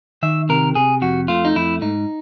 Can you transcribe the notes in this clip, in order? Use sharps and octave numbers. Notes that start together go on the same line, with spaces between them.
D#3 E5
C3 A#4
C3 G#4
F2 F#4
A3 F4
D#4
F2 E4
G#2 D#4